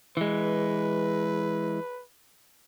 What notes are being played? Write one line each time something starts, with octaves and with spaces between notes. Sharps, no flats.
E3 G#3 B4